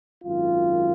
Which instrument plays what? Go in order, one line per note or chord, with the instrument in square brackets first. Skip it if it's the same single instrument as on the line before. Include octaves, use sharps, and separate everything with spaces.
[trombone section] G#1 F#2 D#3 F4